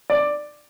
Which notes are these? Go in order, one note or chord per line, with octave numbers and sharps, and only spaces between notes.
D5